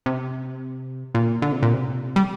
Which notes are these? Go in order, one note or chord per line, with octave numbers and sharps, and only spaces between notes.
C3
A#2
D3
C3
A#2
C3
G3